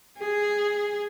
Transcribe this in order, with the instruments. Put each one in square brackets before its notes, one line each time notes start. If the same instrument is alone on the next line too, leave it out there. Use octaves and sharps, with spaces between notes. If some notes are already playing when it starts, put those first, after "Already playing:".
[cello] G#4